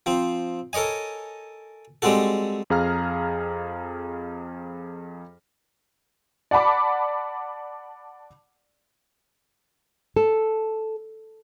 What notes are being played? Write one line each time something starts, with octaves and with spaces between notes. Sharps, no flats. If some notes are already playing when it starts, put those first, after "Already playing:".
F3 C4
A4 A#4 C#5 D#5 G#5
G3 G#3 C4 F#4 A4
F2 G#4 F5 A#5 F6
D5 F#5 A5 B5 D6
A4